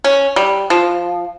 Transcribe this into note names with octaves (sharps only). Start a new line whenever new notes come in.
C#4
G3
F3